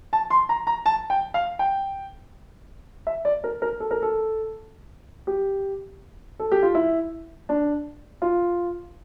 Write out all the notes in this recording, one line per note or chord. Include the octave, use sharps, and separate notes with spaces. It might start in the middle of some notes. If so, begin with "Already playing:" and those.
A5
C6
A#5
A#5
A5
G5
F5
G5
E5
D5
A#4
A#4
A4
A#4
A4
G4
A4
G4
F4
E4
D4
F4